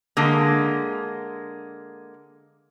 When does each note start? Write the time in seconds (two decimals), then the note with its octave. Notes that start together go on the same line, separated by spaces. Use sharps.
0.17 D3 G#3 A#3